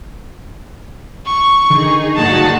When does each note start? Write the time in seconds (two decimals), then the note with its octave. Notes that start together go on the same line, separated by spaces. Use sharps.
1.26 C#6
1.70 D3 D#3 D#4 G#4
2.16 G2 A#2 F#4 F#5 A5